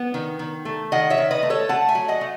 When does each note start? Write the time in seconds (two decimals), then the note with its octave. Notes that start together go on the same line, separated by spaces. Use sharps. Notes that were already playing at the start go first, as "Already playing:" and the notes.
Already playing: B3
0.14 D#3
0.39 D#3
0.65 A3
0.92 D#3 D#5 F#5
1.10 C#5 E5
1.18 D#3
1.31 B4 D#5
1.43 A3
1.50 A4 C#5
1.69 A3 F#5 A5
1.88 E5 G#5
1.95 F#3
2.08 D#5 F#5
2.21 A3